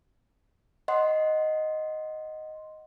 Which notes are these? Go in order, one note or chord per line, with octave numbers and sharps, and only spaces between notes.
D#5 F#5 C6